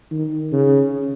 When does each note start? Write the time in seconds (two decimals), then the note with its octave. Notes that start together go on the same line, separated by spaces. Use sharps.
0.11 D#3
0.52 C#3